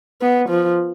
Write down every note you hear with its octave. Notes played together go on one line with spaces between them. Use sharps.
B3
F3